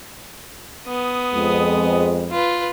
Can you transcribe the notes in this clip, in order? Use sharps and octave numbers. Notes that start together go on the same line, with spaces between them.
B3 D#6
F2 G#3
F4 B4